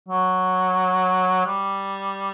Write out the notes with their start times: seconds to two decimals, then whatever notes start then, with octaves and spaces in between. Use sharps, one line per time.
0.08 F#3
1.46 G3